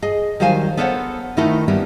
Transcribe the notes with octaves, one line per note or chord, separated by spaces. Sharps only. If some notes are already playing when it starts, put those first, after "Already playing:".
G#4 D#5
D#3 F#3 G3 C5 F5 G#5
B3 A4 A#4 C5 C#5 F#5
D#3 A3 D#4 E4 A4 A#4
G3 A#3 B3 C#4 E4